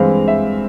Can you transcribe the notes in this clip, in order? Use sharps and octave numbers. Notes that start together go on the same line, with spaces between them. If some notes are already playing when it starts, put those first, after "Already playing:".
Already playing: G2 E3 G#3 C4 F5
E5